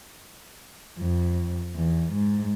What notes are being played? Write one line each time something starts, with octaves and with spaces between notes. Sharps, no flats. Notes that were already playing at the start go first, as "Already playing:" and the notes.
F2
E2
G#2